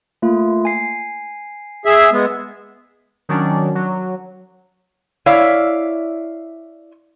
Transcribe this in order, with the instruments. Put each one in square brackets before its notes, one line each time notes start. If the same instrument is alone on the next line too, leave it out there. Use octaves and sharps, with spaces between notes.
[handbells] A3 A#3 F4
G#5 C7
[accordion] G#4 E5
G#3 B3
[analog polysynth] D#3 F#3 C#4 D4
F#3
[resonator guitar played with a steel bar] E4 C#5 D5 E5 F5